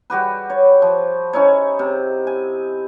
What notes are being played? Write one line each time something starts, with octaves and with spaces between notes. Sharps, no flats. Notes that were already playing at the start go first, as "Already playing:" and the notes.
G3 F#4 G4 B4
C#5
F3
C#4 D#4 E4 C#5
C3
G#5